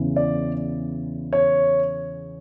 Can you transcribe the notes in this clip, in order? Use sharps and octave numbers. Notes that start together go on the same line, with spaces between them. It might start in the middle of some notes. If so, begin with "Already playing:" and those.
Already playing: E2 C#3 E3
D5
C#5